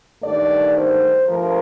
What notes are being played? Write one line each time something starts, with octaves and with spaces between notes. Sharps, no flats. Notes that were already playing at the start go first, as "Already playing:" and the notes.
G2 D#3 A3 D5
C5
G2 F3 A3 A#4